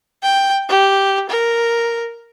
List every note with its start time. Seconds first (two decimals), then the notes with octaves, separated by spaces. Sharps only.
0.23 G5
0.69 G4
1.30 A#4